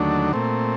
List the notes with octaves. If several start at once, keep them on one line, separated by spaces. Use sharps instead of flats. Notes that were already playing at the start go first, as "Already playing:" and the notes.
Already playing: D#2 D3 F#3 A3 D4
A#2 A3 C4